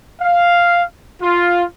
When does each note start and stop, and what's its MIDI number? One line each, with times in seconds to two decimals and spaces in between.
0.19 0.83 77
1.21 1.63 65